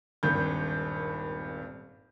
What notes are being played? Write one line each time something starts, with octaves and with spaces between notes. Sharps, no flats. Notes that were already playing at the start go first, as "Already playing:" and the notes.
D#1 G#1 G2 G6